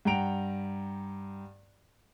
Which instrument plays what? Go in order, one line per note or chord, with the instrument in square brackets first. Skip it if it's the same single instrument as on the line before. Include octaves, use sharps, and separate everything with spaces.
[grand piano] G2 F#5 G5 A#5 D7 F7